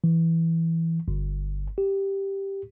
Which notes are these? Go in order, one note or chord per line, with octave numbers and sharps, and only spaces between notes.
E3
G1
G4